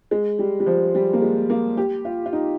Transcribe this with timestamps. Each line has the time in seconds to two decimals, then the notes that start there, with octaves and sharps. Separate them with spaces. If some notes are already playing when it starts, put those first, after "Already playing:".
0.11 G#3
0.39 G3
0.60 G3
0.66 F3
0.95 G3
1.13 A#3
1.22 G#3
1.50 A#3
1.77 G4
2.05 F4
2.26 F4
2.33 D#4